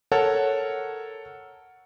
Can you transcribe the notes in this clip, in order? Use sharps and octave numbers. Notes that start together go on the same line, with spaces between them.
A4 A#4 C#5 F#5 A5